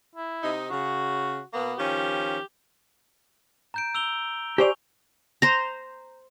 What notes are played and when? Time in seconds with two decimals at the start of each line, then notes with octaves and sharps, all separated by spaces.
0.16 E4
0.43 C3 D#4
0.71 C#3 F#4
1.53 B2 A#3 B3
1.78 D#3 F3 C#4 G4
3.74 A#5 G6 D7
3.95 E6 F7 G7
4.58 G4 C5 D5 G#5 C#6 F7
5.42 C5 A#5